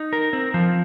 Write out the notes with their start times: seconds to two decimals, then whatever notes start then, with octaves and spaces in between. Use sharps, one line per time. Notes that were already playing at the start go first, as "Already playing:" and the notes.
Already playing: D#4
0.13 A#4
0.33 C4
0.54 F3